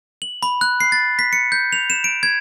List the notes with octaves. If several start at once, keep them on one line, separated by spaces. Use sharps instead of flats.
F#7
B5
F#6
C7
A6
B6
C#7
G6
F7
E7
D7
G#6